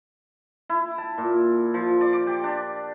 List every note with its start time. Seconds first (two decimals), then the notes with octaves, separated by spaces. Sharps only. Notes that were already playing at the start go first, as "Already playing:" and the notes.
0.69 E4
0.98 A5
1.18 A#2
1.74 F3
2.01 D5
2.13 D6
2.27 G4
2.44 D4